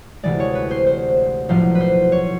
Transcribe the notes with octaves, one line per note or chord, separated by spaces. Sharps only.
D2 C3 E3 G#3 D5
C#5
B4
C5
C5
B1 A2 F3 C5
B4
C5
C#5